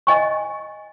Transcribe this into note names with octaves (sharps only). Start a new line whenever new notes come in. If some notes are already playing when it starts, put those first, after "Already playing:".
D#5 G#5 C#6